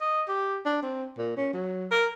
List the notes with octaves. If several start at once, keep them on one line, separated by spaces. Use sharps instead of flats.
D#5
G4
D4
C4
A#2
C#4
F#3
A#4